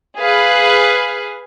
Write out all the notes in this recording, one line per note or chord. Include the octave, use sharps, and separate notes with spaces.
G#4 B4 F5